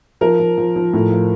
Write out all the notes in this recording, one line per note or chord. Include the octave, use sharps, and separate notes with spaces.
F3 A#4
F3
F3
F3
A2
F3